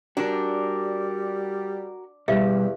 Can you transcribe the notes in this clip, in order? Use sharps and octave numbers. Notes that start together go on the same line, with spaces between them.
G3 D4 F#4 A#4
E2 B2 G3 G4 E5 F5